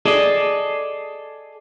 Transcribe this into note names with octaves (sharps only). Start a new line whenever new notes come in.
G#4 A4 D5 D#5